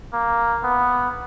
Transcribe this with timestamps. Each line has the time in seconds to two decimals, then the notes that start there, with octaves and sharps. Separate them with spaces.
0.13 A#3
0.64 B3